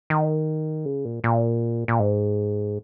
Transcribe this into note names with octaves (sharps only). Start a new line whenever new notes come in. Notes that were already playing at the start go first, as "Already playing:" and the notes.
D#3
C#3
A#2
A#2
A#2
G#2